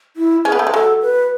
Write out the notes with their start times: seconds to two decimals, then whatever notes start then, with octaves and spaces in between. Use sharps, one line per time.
0.17 E4
0.45 C#4 G#4
0.52 B3
0.59 A3
0.67 G#3
0.73 F#3 A4
1.02 B4